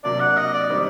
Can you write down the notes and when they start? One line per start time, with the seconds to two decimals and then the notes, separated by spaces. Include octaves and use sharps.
0.04 C3 F#3 A#3 D4 D5
0.20 F#5
0.37 D#5
0.53 D5
0.69 D#3 G3 C4 D#4